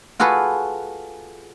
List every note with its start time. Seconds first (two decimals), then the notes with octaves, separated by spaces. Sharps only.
0.20 F4 F#4 G#4 A4 B4